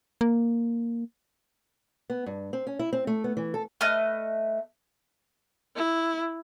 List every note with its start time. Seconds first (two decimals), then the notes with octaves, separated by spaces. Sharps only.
0.21 A#3
2.10 B3
2.26 G2
2.53 C4
2.67 C#4
2.79 E4
2.93 C4
3.07 A3
3.24 B3
3.37 E3
3.54 A4
3.81 A3 B4 D#5 F6
5.76 E4